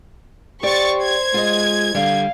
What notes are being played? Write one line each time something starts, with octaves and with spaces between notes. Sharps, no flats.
G4 C5 D5 C#6 A6
G#6
G#3 F4 D#5
D3 G3 F5